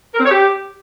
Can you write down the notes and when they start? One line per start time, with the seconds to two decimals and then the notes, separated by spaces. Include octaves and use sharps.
0.14 A#4
0.19 C4
0.25 C#5
0.30 G4